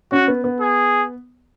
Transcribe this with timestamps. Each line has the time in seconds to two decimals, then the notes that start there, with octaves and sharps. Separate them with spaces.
0.12 C#4 F#4
0.28 B3
0.44 B3
0.60 G#4